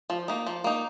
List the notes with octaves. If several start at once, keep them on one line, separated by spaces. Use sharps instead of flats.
F3
A#3 D#4
F3
A#3 D#4